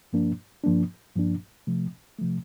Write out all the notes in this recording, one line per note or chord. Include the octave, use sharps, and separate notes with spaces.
G2 F3 A#3 D4
G2 F3 A#3 D4
G2 F3 A#3 D4
C3 F3 A3
C3 F3 A3